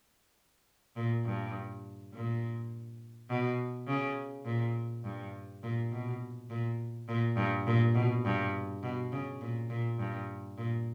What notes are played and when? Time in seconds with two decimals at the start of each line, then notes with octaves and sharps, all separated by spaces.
0.96 A#2
1.25 G2
2.14 A#2
3.30 B2
3.87 C#3
4.45 A#2
5.04 G2
5.63 A#2
5.91 B2
6.50 A#2
7.09 A#2
7.37 G2
7.67 A#2
7.95 B2
8.25 G2
8.83 B2
9.12 C#3
9.41 A#2
9.70 A#2
9.99 G2
10.58 A#2